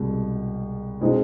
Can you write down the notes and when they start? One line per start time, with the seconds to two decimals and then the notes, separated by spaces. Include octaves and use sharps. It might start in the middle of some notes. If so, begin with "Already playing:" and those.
Already playing: C2 B2 G#3
1.01 B2 G#3 C4 D#4